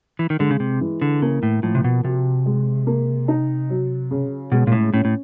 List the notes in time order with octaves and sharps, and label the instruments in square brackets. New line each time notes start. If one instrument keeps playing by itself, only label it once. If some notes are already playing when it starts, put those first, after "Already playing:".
[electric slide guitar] E3
D#3
[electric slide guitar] D3 [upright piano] G#3
[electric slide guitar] C#3
C3
[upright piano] E3
[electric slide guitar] D3
[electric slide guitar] C#3 [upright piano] A#3
[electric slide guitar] A2
[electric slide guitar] A2 [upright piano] F3
[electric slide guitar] C3
B2
[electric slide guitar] C3 [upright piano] F#4
[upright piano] G#3
A#3
D#4
F#3
C#3
[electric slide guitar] B2 [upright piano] G#3
[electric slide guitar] A#2
A2
[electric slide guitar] A2 [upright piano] C#4
[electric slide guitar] A2